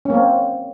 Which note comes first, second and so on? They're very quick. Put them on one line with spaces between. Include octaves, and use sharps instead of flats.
C#4 A#3 C4